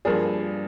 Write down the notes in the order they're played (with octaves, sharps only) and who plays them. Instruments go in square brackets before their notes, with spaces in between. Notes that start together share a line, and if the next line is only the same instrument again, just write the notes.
[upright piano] G2 F3 A#3 D4 G#4